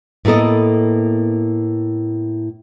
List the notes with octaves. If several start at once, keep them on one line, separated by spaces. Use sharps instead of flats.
A2 A#3 B3 A4 D#5